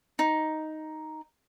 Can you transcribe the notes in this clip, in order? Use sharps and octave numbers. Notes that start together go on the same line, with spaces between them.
D#4